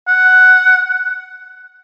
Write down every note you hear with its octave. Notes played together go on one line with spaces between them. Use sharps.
F#5